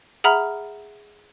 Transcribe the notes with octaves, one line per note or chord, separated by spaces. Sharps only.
G#4 E5 F#5 A#5 B5 F6